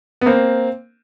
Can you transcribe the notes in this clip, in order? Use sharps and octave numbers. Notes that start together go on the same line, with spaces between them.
B3
A#3 C4